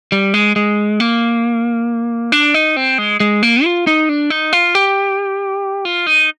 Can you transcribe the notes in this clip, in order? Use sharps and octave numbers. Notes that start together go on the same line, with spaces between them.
G3
G#3
G#3
A#3
D4
D#4
C4
G#3
G#3
A#3
F4
D#4
D4
D#4
F4
G4
F4
D#4